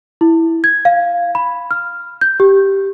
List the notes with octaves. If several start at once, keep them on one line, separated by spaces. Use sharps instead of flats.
E4
G#6
F5
B5
F6
G6
G4